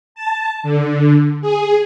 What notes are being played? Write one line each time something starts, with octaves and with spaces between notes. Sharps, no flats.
A5
D3
G#4